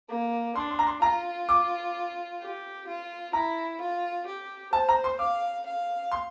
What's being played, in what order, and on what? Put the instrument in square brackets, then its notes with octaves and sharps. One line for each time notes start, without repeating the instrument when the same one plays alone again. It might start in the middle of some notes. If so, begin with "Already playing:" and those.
[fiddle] A#3
[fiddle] D4 [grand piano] C6
[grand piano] C6
A#5
C6
[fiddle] F4 [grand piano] A#5
[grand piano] D6
[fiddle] G4
F4
[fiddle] E4 [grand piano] A#5
[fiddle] F4
G4
[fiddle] C5 [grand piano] A5
[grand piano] A#5
C6
[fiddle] F5 [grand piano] D6
[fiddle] F5
[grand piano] C6